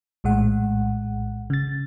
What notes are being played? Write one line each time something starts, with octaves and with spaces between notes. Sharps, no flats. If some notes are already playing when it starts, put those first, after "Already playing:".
A#1 A2 G#3 F#5
C#3 A6